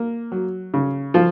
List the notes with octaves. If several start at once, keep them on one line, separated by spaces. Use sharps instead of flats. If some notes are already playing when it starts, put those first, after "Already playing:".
Already playing: A#3
F#3
C#3
F3 F4